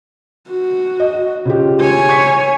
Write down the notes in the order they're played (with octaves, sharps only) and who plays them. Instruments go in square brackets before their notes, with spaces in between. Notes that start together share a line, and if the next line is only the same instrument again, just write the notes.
[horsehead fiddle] F#4
[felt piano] D#5
C#3 F4 G4
[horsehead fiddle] C#5 G#5
[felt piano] C#6 G#6 B6